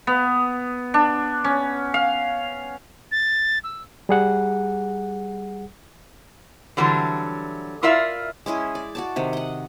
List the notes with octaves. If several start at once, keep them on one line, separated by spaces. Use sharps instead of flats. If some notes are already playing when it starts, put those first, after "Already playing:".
B3
D4
C#4
F5
A6
E6
G3 G#4 F#5
D3 E3 F#3 G3 C4 D4
E4 F4 A#4 D5 E5 F5
G#3 C#4 E4 G#4
D5
F#4 D5 A5
C3 D#3
D#5 F#5